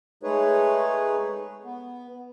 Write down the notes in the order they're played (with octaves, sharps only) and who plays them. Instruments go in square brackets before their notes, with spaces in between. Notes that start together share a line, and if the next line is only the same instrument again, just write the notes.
[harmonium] G#3 A3 D#4 G#4 B4 C#5
B3